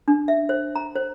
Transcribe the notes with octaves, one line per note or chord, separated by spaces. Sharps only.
D4
E5
C5
A#5
C5